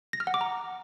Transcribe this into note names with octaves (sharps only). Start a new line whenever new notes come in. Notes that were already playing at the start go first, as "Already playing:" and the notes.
A#6
F6
F#5
D6
A#5